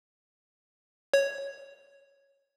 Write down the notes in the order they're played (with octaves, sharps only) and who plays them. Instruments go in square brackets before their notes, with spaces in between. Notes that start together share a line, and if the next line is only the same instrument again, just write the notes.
[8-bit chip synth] C#5